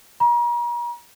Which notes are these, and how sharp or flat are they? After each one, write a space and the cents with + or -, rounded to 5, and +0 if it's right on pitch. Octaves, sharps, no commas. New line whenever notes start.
A#5 +40